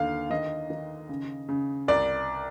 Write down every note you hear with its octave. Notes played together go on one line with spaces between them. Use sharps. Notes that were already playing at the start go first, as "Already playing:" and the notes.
Already playing: D#2 D3 F5
D#3 D#5
D#3
C#3
C#3
C2 D5